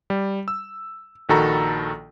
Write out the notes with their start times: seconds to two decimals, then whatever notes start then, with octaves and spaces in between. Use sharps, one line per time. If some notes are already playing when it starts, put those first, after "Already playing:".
0.10 G3
0.48 E6
1.29 A#1 D#3 F#4 A4 A#5 B5